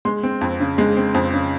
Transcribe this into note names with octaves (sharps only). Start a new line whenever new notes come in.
G#3 C6
C4
F2
C#3
G#3
C4
F2
C#3